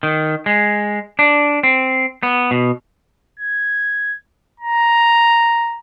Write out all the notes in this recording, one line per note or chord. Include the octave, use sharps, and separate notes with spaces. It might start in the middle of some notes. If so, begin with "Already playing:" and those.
D#3
G#3
D4
C4
B3
B2
G#6
A#5